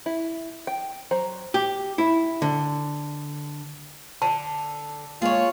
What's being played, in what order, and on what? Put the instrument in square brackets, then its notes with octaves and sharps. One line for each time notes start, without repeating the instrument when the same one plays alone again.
[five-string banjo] E4
G5
F#3 C5 A#5
[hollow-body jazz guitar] G4
E4
D3
[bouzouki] D3 [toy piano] A5
[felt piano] G#3 A#3 [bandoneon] F4 [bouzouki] G#4 C#5